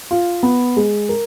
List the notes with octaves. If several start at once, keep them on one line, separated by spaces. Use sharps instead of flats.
F4
B3
G#3
A#4